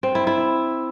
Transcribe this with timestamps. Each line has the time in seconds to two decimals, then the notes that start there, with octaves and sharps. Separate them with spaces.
0.03 C4
0.15 E4
0.27 E4